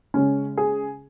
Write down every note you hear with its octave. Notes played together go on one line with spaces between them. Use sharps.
C#3 G#3 C#4
G#4